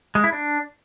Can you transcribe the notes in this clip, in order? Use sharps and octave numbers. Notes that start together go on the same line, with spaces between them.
G#3
E4
D4